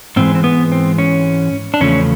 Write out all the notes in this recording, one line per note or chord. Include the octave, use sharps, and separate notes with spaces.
G#2 E3 G#3 C4
C4
B3
C4
C#4
D4
E2 C#3 F3 A3 C#4